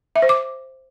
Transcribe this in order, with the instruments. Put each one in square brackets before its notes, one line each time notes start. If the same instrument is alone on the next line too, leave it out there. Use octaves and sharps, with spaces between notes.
[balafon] E5
C5
D6